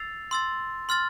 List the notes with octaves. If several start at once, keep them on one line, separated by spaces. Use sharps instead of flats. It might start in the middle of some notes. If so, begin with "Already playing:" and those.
Already playing: E6 A6 C7 F7
C6 E6 A6
C6 F6 A6